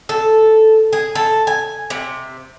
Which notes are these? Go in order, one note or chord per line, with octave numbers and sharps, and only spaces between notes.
A4
G#4
A4
G#5
C3